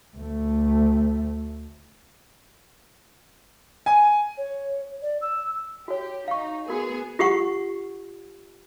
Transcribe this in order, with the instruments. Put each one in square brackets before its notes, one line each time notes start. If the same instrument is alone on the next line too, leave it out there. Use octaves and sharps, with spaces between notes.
[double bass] D2 A3
[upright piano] G#5
[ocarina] C#5
D5
E6
[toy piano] F#4 C#5 [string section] G4
[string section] D#4 [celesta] F5 C#6
[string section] B3 G#4 [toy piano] F#4 A#4
[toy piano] F4 G4 F#5 C#6